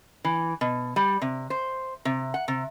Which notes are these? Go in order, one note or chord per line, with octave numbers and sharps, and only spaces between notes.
E3
B2
G3
C3
C5
C3
F#5
C3